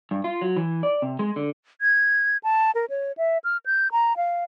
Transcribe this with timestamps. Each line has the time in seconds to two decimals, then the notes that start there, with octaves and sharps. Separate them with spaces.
0.11 G2
0.24 F4
0.42 F#3
0.56 E3
0.83 D5
1.02 C3
1.19 G#3
1.36 D3
1.81 G#6
2.43 A5
2.75 A#4
2.90 C#5
3.17 E5
3.44 F6
3.66 G6
3.92 A#5
4.17 F5